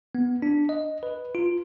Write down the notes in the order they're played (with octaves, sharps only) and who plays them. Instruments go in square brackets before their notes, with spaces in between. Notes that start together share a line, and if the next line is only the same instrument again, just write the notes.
[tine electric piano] B3
D4
D#5
B4
F4